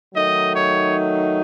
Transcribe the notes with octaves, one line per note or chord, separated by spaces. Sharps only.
D#3 F#3 A3 D#4 D#5
C#5